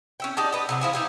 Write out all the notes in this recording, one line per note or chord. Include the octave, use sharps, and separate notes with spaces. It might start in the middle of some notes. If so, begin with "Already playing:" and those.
C#4 E5 G5
D#4 G4 D5 A5
B4 D#5
C3 D#3 F#3
F3 E4 G#4
D#4 E4 G4